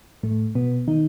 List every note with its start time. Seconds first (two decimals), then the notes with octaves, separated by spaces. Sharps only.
0.23 A2 A3
0.55 B2 B3
0.88 D#3 D#4